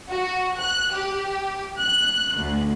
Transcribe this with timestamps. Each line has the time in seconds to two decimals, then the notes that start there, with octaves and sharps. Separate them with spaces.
0.10 F#4
0.58 F#6
0.92 G4
1.78 F#6
2.35 D2